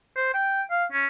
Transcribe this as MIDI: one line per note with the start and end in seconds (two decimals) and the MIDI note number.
0.16 0.33 72
0.34 0.62 79
0.71 0.85 77
0.92 1.07 61